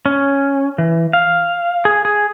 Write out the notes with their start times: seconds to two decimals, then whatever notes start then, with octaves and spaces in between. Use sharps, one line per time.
0.06 C#4
0.78 E3
1.13 F5
1.85 G#4
2.05 G#4